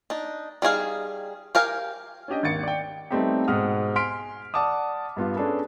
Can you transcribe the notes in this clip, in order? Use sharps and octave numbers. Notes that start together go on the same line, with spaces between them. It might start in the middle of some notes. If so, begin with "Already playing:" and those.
D4 D#4
G3 D#4 G#4 F5
G4 A#4 F5 G#5
C#4 D4 G4 D#5
G#1 D#2 A6 C#7
D5 G5
G3 A3 B3 C4 D#4 G4
G#2 B2 F#5 D#6 F6
G#5 C6 F6 B6 D7
D5 F#5 A5 D6 D#6
G2 B3 F4
C#4 D4 G#4 A4 B4